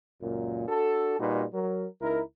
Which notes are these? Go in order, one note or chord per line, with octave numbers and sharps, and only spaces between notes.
C#2 F#2 A#2
D4 F#4 A4
A#2 G3 D#4 F#4 B4
F#3 A#4
C#2 D#4 E4 A#4